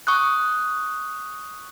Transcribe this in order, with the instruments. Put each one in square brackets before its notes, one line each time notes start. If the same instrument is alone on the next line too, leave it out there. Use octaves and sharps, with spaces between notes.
[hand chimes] C#6 D#6 F#6